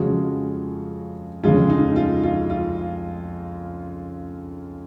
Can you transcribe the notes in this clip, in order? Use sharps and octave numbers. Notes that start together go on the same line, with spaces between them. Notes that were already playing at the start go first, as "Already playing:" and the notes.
Already playing: F2 C#3 F3 G#3 F#4
F2 C#3 G#3 F4
D#4
F4
F4
F4